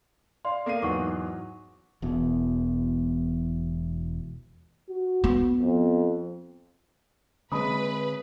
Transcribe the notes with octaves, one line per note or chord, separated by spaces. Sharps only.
D5 F5 C6
A#3 A4 F5 C7 D#7
E2 G#2 F#3 F#5 C#6 D6
E1 E2 B2
F#4
B3
F2
D3 G#3 C4 B4 B5 D#6